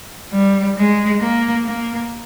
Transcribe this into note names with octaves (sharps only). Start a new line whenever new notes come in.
G3
G#3
A#3
A#3